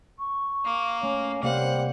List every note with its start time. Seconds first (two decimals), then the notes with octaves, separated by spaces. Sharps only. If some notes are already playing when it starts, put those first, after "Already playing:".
0.18 C#6
0.65 A#3
1.03 A3 C#4
1.43 C3 G3 A#3 C5 F5 F#5